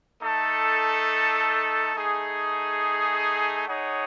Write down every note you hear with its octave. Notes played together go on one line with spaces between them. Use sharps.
A3 D#4 A4
A3 D#4 G#4
D#4 G#4 C#5 F#5